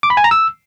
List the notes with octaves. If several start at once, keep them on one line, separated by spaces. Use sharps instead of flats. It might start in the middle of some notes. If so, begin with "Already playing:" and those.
D6
B5
G#5
A#5
E6